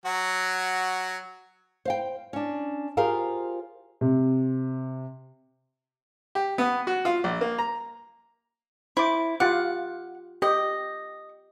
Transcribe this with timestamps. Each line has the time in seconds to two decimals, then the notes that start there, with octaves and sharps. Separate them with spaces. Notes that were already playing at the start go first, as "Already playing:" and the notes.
0.06 F#3 F#4
1.85 C5 F5 G5
2.33 C#4 D4
2.97 F4 G4 G#4 A#4 C5 F5
4.01 C3
6.35 G4
6.58 B3
6.87 F#4
7.05 F4
7.24 A#1
7.41 A#3
7.58 A#5
8.97 E4 C5 D6
9.40 F4 G4 F#5 D6
10.42 G4 D#5